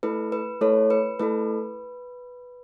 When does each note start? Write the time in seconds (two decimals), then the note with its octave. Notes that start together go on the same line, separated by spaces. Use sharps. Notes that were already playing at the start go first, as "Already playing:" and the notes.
0.03 A3 E4 A4 B4
0.32 B4
0.61 A3 E4 A4 C#5
0.90 B4
1.19 A3 E4 A4 B4